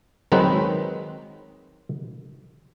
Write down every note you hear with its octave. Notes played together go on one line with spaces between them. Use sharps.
D#3 F#3 G#3 C4 D#4 B4